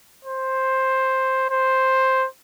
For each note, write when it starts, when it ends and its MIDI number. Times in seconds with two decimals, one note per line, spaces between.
0.25 1.47 72
1.50 2.26 72